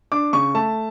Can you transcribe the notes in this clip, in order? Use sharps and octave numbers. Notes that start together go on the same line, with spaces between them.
D4 D6
C#3 C#6
A3 A5